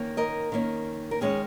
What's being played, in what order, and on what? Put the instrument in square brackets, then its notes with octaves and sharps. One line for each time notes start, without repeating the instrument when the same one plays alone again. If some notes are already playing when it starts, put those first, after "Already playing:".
Already playing: [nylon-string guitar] D#3 A#3 C#4
A#4 D#5
D#3 A#3 C#4
A#4
D#3 G#3 C#4 G#4 C#5